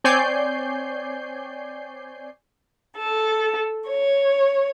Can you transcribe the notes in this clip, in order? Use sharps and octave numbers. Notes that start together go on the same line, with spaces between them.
C4 C#5 D5 G#5 G6 C7
A4
C#5